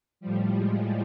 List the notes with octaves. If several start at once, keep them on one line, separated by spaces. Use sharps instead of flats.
A2 F3 G3
G#3